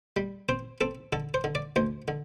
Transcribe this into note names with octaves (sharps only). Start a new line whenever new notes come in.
G3
C4 C5
C4 A4
D3 A4
C5
D3
D5
D2 C5
D3